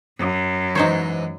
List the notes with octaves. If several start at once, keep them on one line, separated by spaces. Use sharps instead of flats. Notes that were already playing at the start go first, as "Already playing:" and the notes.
F#2
G#2 E3 D#4 C5 C#5